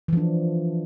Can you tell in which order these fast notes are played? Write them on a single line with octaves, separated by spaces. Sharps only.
E3 F3 D4